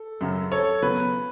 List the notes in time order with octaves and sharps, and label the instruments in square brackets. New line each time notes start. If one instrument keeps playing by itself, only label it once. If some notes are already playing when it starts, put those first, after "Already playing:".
Already playing: [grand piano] A4
[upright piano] F#2 C#3 F#3
[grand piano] A4 C#5
[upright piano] C#3 F#3 B3 [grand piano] B4